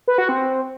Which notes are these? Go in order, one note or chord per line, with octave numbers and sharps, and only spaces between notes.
B4
F#4
C4